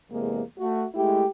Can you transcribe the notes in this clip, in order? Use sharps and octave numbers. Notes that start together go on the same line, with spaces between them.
E2 C3 G#3 A#3
A3 F#4
G#3 A3 E4 G4